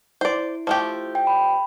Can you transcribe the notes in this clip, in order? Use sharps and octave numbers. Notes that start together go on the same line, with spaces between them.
E4 C5 D5
F3 A3 G4
G5
B5